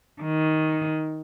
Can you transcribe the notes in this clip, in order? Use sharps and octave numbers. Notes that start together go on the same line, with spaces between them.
D#3